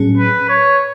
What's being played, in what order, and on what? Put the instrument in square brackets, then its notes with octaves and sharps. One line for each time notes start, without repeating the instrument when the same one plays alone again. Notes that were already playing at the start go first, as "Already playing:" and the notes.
Already playing: [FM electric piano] A2 F#3 C#4 G#4
[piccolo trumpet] B4
C#5